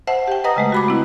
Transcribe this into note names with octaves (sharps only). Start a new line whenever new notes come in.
C5 E5 F#5 A5
G4 G5
B4 D#5 F#5 A#5 D#6 A#6
C#3 G#3 A3
F#4 B5 D6
C4 E4